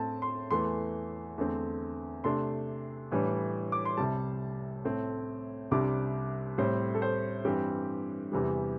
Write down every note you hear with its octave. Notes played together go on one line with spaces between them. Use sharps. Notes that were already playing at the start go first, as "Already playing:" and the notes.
Already playing: A2 A3 C4 A5
C6
E2 E3 A3 C6
E2 D3 A3 C4
C3 A3 D4 C6
A2 E3 G3 D4
D6
C6
C2 C3 G3 A5
A2 A3 C4
C2 C3 G3 D4 D6
A2 G3 C4 C5
A4
C5
G2 E3 G3 C4 G4
E2 C3 E3 G3